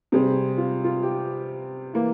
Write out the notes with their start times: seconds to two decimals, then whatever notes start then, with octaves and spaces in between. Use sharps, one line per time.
0.12 C3 G3 C4 G#4
0.58 F4
0.84 F4
1.03 G4
1.94 E3 A#3